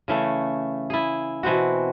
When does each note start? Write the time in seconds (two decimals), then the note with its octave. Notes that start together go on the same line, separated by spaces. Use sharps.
0.08 C#3 E3 A3 C#5
0.90 E4 G#4
1.43 B2 E3 C4 F#4